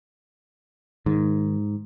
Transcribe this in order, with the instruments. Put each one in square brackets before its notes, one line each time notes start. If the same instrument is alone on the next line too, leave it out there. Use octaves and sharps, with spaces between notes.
[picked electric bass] G#2 [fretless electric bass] D#3